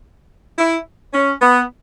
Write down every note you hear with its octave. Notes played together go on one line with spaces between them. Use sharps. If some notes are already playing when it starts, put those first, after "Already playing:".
E4
C#4
B3